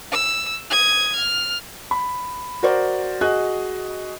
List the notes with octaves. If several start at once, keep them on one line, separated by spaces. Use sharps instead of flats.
E6
D#6 G#6
F6
B5
F#4 A#4 C5 D5
F#4 G#4 D#5 F#6